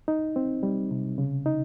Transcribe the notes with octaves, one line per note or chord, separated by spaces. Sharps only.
D#4
C4
G3
C3
C#3
D#4